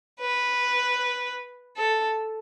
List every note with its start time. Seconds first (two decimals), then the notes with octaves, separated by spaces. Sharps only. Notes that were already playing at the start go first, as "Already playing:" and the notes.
0.20 B4
1.77 A4